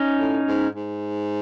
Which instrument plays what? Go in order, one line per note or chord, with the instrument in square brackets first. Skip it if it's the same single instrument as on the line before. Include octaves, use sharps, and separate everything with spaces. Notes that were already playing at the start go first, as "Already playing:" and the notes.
Already playing: [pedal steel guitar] C#4 D#4
[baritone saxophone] A2
G#2
G#2